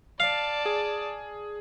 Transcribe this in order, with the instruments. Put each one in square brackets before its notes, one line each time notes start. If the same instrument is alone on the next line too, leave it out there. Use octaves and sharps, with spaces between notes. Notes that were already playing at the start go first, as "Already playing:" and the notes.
[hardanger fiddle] D5 A5 [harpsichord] F5
[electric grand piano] G#4